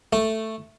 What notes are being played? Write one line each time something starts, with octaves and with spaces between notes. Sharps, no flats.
A3